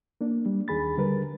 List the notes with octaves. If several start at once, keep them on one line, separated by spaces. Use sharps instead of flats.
A#3 D4
G3
D#2 D#3 G#4 B5 A6
D3 G3 A#4 B4